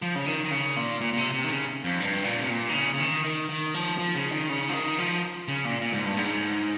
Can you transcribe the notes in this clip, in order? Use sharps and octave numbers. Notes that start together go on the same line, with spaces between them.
F3
C#3
D#3
D#3
C#3
A#2
A#2
A#2
C3
C3
D#3
C#3
F2
G2
A#2
C3
A#2
D#3
C#3
C#3
D#3
D#3
D#3
F3
F3
C#3
D#3
C#3
F3
D#3
F3
C#3
A#2
A#2
G#2
G2
G#2